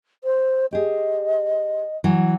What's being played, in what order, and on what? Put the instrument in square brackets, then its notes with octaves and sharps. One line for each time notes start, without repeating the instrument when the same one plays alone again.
[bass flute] C5
[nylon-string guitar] G4 G#4 [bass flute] D#5
[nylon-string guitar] E3 F#3